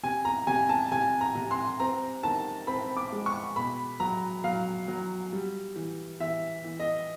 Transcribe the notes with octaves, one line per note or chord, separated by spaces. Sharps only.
C3 G#5
A#5
C3 G#5
A5
C3 G#5
A#5
C3
C6
C4 A#5
D#3 A5
C4 B5
D6
G#3
C#6
B2 B5
F#3 A#5
F#3 F5
F#3
G3
E3
E3 E5
E3
D#5